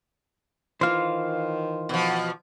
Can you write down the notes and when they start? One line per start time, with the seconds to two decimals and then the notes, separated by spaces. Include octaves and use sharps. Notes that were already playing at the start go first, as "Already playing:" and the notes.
0.81 D#3 E3 F4 C5 F5
1.89 B2 F3